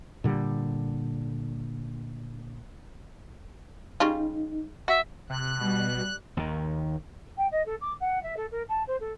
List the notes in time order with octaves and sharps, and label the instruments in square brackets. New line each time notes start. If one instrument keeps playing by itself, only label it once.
[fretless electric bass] A#2 D3 G3
[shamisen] C#3 G3 F4 [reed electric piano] D#4
[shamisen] F#4 [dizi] E5
[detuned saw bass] C3 [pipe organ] F#6
[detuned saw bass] B2 [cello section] G3
[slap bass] D#2 D#3
[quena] G5
D#5
A4
D6
F#5
E5
A4
A#4
A5
C5
A4